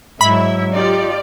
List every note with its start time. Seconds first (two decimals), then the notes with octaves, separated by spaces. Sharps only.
0.21 G#2 F#3 E4 E5 B5
0.73 D#4 F4 G4 D5